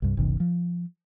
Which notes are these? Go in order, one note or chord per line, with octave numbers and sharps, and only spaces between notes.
C2 G2
F#1 C2 B2 D#3
F3